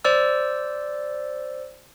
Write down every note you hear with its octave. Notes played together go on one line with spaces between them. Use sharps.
C5 D5 E6